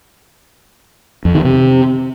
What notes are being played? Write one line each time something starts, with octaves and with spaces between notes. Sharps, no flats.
F2
D#3
C3